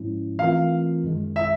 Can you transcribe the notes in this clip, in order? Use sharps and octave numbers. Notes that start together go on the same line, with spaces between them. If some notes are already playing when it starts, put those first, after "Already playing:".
Already playing: G#2 F3 G#3 C#4 E4
E3 A3 C4 F4 A#4 F5
F#2 D#3 G#3
E5